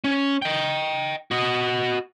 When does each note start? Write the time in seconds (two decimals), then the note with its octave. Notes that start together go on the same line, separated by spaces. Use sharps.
0.04 C#4
0.42 D#5 G5
1.31 F#4 D#5